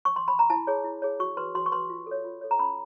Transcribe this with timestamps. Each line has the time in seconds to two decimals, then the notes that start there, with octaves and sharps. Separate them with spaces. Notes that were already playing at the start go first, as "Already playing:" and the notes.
0.05 C#6
0.16 C6
0.28 B5
0.39 A#5
0.50 E4 A5
0.67 G#4 C#5
0.84 E4
1.02 G#4 C#5
1.20 F#4 C#6
1.37 B4 C6
1.55 F#4 C6
1.66 C#6
1.72 B4 C6
1.89 F4
2.07 A4 C#5
2.24 F4
2.41 A4 C#5
2.51 A#5
2.59 C#4 B5